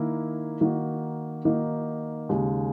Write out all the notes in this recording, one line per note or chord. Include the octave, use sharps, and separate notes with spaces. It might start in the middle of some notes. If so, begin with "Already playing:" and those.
Already playing: D#3 A#3 E4
D#3 A#3 D#4 F#4
D#3 A#3 D#4 F#4
D#2 C#3 G#3